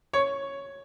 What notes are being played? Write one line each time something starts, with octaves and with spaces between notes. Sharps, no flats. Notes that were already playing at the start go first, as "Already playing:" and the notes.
C#5